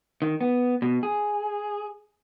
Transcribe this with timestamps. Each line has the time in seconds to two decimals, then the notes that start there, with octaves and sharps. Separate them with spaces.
0.22 D#3
0.41 B3
0.82 B2
1.03 G#4